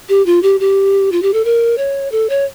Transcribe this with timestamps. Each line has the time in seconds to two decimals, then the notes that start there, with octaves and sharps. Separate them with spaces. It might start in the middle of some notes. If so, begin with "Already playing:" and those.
0.09 G4
0.26 F4
0.43 G4
0.60 G4
1.12 F4
1.22 G4
1.33 A4
1.45 A#4
1.78 C#5
2.12 A4
2.30 C#5